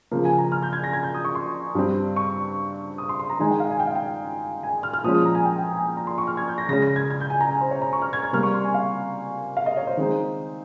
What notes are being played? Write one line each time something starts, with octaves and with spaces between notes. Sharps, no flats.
C#3 F3 A#3
G#5
A#5
F6
G6
G#6
A#6
G#6
G6
D#6
C#6
C6
G2 G3 C4
C#6
D#6
C6
C6
A#5
D#3 G#3 D#4 G#5
G5
F5
G#5
G5
F5
G5
G#5
F6
F6
A#2 F3 G#3 C#4 D#6
D#6
A#5
G#5
G5
G5
G#5
A#5
C6
C#6
F6
G#6
G6
A#6
C#3 G#3 C#4 A#6
A#6
G#6
G#6
G6
G#5
A#5
G#5
C5
C#5
A#5
C#6
F6
G#6
G#6
C3 G3 A#3 F6
C#6
C6
G#5
F5
F5
D#5
C#5
C5
D#3 G#3 C4 D#4